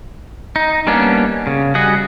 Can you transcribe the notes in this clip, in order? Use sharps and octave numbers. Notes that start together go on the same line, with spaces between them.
D#4
G3 A#3 B3 C#4 D4
C#3
G3 F#4 G#4 D#5 F#5